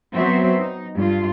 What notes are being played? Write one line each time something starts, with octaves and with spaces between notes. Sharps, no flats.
F#3 B3 C4 F#4 C5 E5
D#4
G2 F4